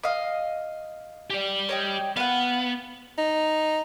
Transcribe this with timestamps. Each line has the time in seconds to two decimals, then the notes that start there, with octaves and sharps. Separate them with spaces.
0.03 D#5 F5
1.30 G4 D5
1.69 C#5 D#5 G5
2.16 B3 F5 F#5
3.18 D#4